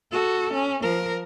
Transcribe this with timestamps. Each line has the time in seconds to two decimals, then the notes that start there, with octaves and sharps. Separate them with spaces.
0.12 F#4 A4
0.53 C#4
0.82 F3 A#4